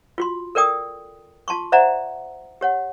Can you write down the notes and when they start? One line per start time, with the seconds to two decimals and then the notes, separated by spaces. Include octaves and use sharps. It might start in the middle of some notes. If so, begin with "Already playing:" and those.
0.18 F4 F#4 C6
0.55 A4 A#4 D5 G5 D#6
1.48 F4 A5 C6 C#6
1.72 C5 D5 E5 F#5 A#5
2.61 G4 C#5 F#5